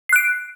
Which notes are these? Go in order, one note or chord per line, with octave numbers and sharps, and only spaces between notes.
F#6 C7 D7